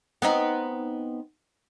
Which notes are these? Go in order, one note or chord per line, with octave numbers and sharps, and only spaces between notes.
B3 C4 D#4